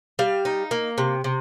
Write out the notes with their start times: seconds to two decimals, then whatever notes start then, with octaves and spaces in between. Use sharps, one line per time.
0.19 G3 F5
0.45 D#4
0.71 A#3
0.98 C3
1.24 C3